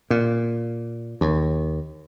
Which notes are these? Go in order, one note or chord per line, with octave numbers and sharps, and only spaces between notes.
A#2
D#2